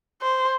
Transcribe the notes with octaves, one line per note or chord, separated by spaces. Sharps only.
C5